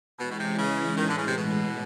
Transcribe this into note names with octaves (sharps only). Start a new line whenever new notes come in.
B2 E3 G#3 C#4 E4
B2
C3
C#3
A2 D#3 E3 G#3
D3
C#3
C3
B2